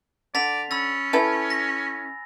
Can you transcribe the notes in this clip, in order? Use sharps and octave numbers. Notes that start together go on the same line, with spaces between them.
D3 D5 A6 B6 F7
C#4 B5 E6 A6
E4 A4 B4 G#5
A#6